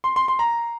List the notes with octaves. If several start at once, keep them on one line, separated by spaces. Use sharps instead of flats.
C6
C6
C6
A#5